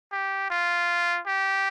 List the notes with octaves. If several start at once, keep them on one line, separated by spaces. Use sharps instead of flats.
G4
F4
G4